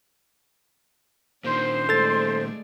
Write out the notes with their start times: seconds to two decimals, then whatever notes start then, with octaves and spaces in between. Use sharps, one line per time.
1.44 A#2 D#3 D4 C5
1.89 G#3 A3 A4 D5 A6